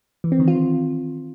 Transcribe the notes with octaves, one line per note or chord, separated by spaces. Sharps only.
E3
C4
D#3
F4